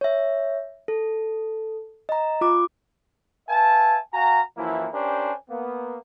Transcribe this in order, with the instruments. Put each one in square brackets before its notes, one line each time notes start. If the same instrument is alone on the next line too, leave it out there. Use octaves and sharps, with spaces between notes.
[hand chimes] C#5 E5
A4
D#5 A#5
F4 D6
[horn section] B4 E5 F5 G#5 A5
F#4 F5 G#5 A#5
F#2 E3 F3 A#3 E4
C#4 D4 G4 A#4 C5 G#5
A#3 B3